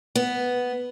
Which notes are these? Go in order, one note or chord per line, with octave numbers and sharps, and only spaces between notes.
B3